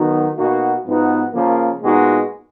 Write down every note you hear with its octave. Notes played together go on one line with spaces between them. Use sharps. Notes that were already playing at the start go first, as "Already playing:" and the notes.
Already playing: D#3 F#3 B3 D#4 F#4
B2 A#3 D#4 F#4
G#2 F3 B3 D#4 F#4
C#3 F3 A#3
A#2 G#3 B3 D#4 F#4